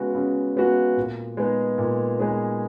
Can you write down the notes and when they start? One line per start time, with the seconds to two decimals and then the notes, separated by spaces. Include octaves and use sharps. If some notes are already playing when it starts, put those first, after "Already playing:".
Already playing: C#3 G#3 B3 F#4
0.15 C#3
0.56 G#3 B3 F#4
0.97 A#2
1.37 G#3 B3 D#4 G#4
1.78 A#2
2.19 G#3 B3 D#4 G#4